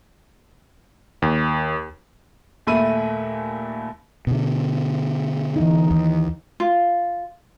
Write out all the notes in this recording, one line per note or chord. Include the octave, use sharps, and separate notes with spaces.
D#2
D#2 A#2 A3 E5 B5 D#7
B2 D3
E3 D#4
D#2
F4